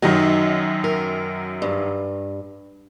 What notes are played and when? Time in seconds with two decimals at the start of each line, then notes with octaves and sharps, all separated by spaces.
0.02 F#2 D#3 F#3 D#4
0.84 A#4
1.62 G2